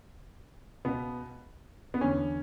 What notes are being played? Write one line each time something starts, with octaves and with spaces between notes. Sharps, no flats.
C#2 B2 B3
B3
E2 D3 C#4